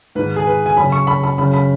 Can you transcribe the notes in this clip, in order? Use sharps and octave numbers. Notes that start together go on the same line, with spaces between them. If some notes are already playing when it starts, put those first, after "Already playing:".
G#2 D#3 B4
G#4
B4
G#5
F#2 C#3 B5
C#6
B5
B5
F#2 C#3 B5
B5